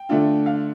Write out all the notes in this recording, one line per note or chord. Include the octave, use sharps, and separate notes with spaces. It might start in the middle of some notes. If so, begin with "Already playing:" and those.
Already playing: G5
D3 A3 D4 F4
F5